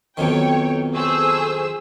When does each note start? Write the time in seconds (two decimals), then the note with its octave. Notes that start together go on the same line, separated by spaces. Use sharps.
0.17 B1 F2 D#3 B3 C4 C#5 G5
0.95 G#4 A4 C5 C#6 E6